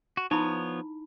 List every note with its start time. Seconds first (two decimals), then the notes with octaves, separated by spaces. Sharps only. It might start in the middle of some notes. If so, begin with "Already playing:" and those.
0.17 F#4
0.31 F3 B3 D#4 E4 C#5 B5